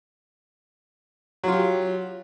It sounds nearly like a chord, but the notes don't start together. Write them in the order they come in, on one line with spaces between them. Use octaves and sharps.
F#3 F4 G4